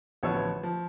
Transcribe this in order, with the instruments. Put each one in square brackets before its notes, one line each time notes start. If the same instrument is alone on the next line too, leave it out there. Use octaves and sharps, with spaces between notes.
[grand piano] A1 D2 F3 B3 C#5 E6
F3